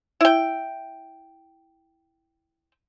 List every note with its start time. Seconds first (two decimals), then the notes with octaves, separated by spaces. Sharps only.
0.21 E4 G5